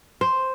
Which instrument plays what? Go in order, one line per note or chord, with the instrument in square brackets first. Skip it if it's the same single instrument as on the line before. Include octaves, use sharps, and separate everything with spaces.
[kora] C5